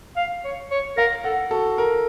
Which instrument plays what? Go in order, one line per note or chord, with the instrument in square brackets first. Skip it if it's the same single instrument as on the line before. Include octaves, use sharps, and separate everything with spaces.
[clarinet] F5
C#5
C#5
[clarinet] A#4 [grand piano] F5
[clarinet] A4 [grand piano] F#5
[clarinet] F#4 [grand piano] A4
[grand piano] A#4